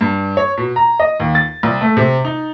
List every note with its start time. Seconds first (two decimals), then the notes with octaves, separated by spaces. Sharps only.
0.01 G2
0.37 C#5
0.58 B2
0.76 A#5
1.00 D#5
1.20 D#2
1.35 A6
1.63 C2
1.81 A3
1.97 C3
2.25 D#4